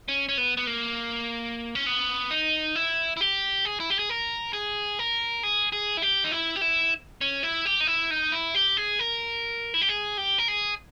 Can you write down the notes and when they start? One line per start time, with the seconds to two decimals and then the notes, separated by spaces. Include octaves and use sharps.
0.08 C#4
0.29 C#4
0.38 B3
0.57 B3
0.67 A#3
1.75 C#4
1.87 B3
2.31 D#4
2.75 E4
3.17 E4
3.21 G4
3.65 G#4
3.80 E4
3.90 G4
3.99 G#4
4.10 A#4
4.53 G#4
4.99 A#4
5.43 G#4
5.72 G#4
5.97 E4
6.02 G4
6.24 D#4
6.32 E4
6.56 G4
6.61 E4
7.21 C#4
7.43 E4
7.65 G4
7.81 D#4
7.87 E4
8.11 D#4
8.32 E4
8.55 G4
8.77 G#4
8.99 A#4
9.74 E4
9.82 G4
9.89 G#4
10.18 G4
10.38 A#4
10.48 G#4